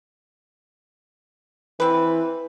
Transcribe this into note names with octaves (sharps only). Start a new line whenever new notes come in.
E3 C4 B4